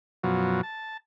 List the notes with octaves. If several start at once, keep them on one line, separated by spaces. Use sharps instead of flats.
F#2 B2 F3 F#3
A5